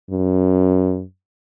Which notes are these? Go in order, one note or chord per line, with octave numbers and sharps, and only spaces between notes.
F#2